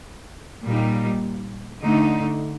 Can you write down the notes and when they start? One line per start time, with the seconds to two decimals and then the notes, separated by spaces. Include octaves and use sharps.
0.64 A#2 G3 A#3 D#4
1.81 D3 A3 D#4